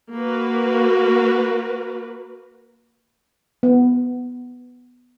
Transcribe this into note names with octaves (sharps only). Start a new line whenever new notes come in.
A#3 F#4 A#4 B4
B3